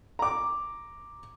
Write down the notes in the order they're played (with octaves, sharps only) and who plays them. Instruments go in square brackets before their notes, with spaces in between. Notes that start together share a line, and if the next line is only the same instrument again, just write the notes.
[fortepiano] A#5 D6